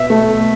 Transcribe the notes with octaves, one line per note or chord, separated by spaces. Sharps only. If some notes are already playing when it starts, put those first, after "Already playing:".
Already playing: B2 E5
A3